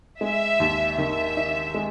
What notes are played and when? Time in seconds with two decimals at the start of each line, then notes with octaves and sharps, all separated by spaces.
0.21 G#3 E5
0.60 D#2
0.98 D#3 E5
1.37 D#4
1.74 G#3